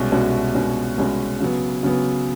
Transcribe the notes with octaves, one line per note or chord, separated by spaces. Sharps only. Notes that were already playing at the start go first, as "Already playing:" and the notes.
Already playing: C2 B2 G#3 C#4 F#4
C2 B2 G#3 C#4 F#4
C2 B2 G#3 C#4 F#4
C2 B2 G#3 C#4 F#4
C#3 F#3 B3
C#3 F#3 B3